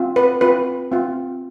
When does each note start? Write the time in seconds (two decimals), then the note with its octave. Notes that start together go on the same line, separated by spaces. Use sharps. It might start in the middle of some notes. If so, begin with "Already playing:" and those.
Already playing: C4 F4
0.16 B4
0.41 C4 F4 B4
0.92 C4 F4